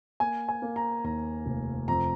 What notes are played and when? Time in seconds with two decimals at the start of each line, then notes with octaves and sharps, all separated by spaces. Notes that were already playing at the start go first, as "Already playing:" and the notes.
0.20 A#3 G#5
0.49 G#5
0.62 A#3
0.76 A#5
1.04 D#2 A#5
1.46 F1
1.88 F2 A#5